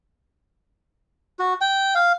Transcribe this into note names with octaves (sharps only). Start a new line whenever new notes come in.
F#4
G5
F5